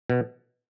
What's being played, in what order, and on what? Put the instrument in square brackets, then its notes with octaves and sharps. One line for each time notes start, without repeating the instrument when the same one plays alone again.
[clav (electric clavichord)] B2